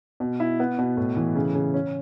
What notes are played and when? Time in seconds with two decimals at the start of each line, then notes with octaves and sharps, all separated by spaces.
0.20 B2
0.40 E4
0.60 B3
0.79 B2
0.97 A2
1.17 E3
1.35 C#3
1.55 C#3
1.74 C#4